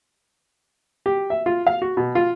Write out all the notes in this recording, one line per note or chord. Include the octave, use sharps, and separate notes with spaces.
G4
E5
F4
F5
F#4
B2
F4